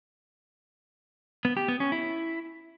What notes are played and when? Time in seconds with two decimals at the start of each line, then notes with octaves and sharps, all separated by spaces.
1.45 B3
1.57 G4
1.68 B3
1.80 C#4
1.92 E4